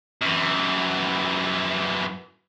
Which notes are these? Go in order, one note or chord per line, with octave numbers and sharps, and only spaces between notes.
F#2 E3